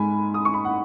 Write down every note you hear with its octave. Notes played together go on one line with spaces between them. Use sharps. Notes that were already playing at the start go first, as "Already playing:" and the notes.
Already playing: G#2 G#3 G#5 B5
D#6
C#6
B5
F#5